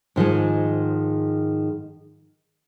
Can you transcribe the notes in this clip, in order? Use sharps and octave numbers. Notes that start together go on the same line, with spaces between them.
G#2 D#3 F3 G#3